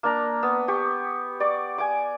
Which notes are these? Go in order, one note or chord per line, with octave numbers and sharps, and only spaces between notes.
A#3 D4 A#5
B3
G4 C#6
D5 C#6 D6
G#5 D6